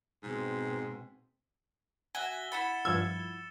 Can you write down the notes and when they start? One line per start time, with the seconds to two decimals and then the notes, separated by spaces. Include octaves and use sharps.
0.23 G#2 B2 C4
2.15 F#4 E5 G#5 G7
2.52 E4 F#5 B5 A6 C#7 E7
2.85 G2 F3 E6 G#6